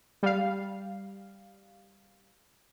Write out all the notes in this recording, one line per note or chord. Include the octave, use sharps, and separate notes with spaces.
G3 F5